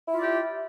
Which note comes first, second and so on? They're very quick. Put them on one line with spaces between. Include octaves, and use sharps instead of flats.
E4 E5 F4 D5 G4